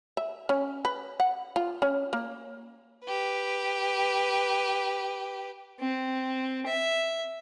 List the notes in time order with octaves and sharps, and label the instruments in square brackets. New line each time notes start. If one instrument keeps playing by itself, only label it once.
[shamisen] E5
C#4
B4
F#5
F4
C#4
A#3
[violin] G4 B4
[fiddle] C4
E5